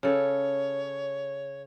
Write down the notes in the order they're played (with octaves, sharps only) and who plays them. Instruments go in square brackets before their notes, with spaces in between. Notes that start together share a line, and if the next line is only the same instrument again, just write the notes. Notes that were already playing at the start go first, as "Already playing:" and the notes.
[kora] C#3 A4 [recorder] C#5